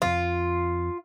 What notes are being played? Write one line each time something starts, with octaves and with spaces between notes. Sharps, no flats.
F2 F3 F4